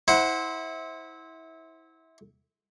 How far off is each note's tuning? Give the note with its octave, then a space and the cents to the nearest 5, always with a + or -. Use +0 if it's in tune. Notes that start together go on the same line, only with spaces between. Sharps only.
E4 -25 C5 +0 F#5 +0